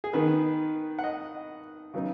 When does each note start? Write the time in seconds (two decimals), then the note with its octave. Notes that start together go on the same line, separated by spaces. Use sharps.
0.04 G#4
0.13 D#3 B3 D#4 B4
0.99 F#5
1.04 D#5
1.93 C#3 F#3 B3 D#4